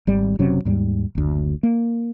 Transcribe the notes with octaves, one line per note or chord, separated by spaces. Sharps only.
G#1 G3
F#1 C3 F#3 C#4
D#2 G#2 G3
F#1 D2
A#3